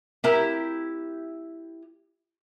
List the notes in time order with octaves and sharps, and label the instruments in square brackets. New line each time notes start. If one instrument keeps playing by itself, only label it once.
[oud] E4 G4 A#4